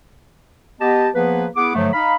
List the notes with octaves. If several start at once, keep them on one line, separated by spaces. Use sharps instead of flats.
B3 G4 D#5 A5
F3 A#3 B3 G#4 B4
B3 E4 G#4 F#5 D6
G2 D3 F3 F#3 A3
D#4 F5 B5